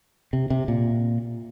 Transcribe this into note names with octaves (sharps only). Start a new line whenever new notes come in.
C3
C3
A#2